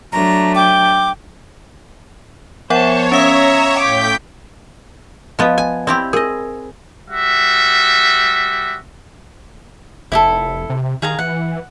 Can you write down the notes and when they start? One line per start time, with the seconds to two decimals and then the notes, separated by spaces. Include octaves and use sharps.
0.12 F#3 A3 D4 A#5
0.55 G5 D6
2.70 F3 B3 C5 C#5 F#5 A5
3.12 C#4 E5 F5 A#5 D#6
3.79 A2 G5 D6 G6 B6
5.39 F3 B3 D5 D#5 F5
5.58 G#5
5.87 C4 E4 G4 D5 B5 C6
6.13 G#4 A#4 D#5
7.10 G3 F#4 E5
10.12 F1 E4 G4 A4
10.70 C3
11.02 D#3 G#4 F5 A#5
11.19 E3 F#5